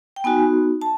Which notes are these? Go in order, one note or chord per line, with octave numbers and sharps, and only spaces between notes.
G5
B3 D#4 F#4 G#5
A5